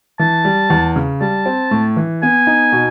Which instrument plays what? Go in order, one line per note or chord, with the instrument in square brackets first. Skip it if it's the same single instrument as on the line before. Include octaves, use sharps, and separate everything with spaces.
[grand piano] E3 [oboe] A5
[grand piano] G3
E2
C#3
[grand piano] G3 [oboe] A5
[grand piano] C4
A2
E3
[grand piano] B3 [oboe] G#5
[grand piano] D#4
B2